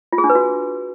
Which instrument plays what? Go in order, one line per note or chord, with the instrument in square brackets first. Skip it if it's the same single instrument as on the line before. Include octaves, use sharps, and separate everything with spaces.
[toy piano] F4
G#4
D4
B4
F#4